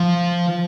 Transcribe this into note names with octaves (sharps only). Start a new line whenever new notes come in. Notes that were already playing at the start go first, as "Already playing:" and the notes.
Already playing: F3